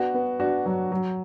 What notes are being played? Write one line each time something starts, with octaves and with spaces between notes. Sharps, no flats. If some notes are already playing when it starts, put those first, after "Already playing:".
Already playing: B3 D4 F#4
B3
D4 F#4
F#3
F#3